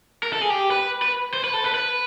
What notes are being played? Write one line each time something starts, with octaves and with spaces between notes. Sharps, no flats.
A#4
A4
G#4
G4
B4
B4
C5
B4
A4
B4
B4